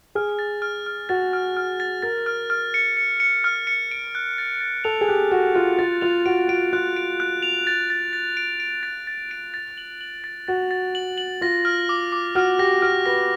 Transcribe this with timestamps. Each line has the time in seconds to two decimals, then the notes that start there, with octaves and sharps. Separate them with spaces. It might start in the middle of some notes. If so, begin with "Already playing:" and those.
0.15 G#4 F6
0.39 A6
0.62 F6
0.86 F6
1.09 F#4 A6
1.33 F6
1.57 F6
1.80 A6
2.03 A#4 A6
2.26 F6
2.50 F6
2.74 C#7
2.97 C#7
3.20 C#7
3.44 F6
3.67 C#7
3.91 D7
4.15 F#6
4.38 A6
4.61 A6
4.84 A4 F7
5.01 G#4
5.08 G4 F#6
5.32 F#4 F#6
5.54 F4 F#6
5.79 F4 A6
6.01 F4 F7
6.26 F#4 D7
6.49 F#4 D7
6.73 F4 F#6
6.96 D7
7.20 F#6
7.42 F7
7.67 A6
7.90 A6
8.13 A6
8.37 D7
8.60 D7
8.83 A6
9.07 A6
9.31 D7
9.54 A6
9.78 F#7
10.01 F#7
10.24 A6
10.48 F#4 A6
10.71 A6
10.95 F#7
11.18 F#7
11.41 F4 A#6
11.65 F6
11.89 D6
12.12 D6
12.35 F#4 F6
12.59 G4 A#6
12.82 F#4 F6
13.06 B4 A#6